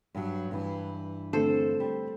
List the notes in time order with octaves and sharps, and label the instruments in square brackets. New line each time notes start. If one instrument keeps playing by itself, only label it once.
[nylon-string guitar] G2 F#3
G2 E3
[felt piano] D3 A3 C4 [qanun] A4 C5
[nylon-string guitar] G3